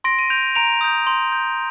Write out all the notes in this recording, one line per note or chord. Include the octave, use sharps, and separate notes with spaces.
C6 A#6 D7
D#7
G6 D7 F7
A#5 D7 F7
D#6 G6
C6
G6